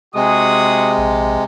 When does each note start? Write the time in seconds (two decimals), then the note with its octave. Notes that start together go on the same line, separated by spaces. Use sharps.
0.15 C3 G#3 F#4 G#4 D#6
0.98 A#1